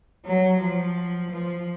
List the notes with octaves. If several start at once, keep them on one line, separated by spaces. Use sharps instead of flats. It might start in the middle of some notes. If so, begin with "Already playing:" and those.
F#3
F3
F3